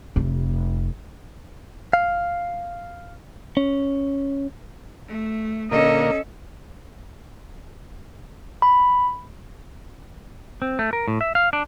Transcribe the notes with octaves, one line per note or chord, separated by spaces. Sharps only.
F1
F5
C#4
A3
A#2 D3 A#3 C#4 A4 D#5
B5
C4
A3
A#4
A2
E5
F5
D4